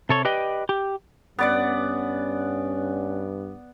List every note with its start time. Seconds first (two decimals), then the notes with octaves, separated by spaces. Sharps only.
0.09 C3 A4 C#5
0.25 G4 B4 D5 D#5 G5
0.69 G4
1.39 G2 B3 C#4 D5 F#5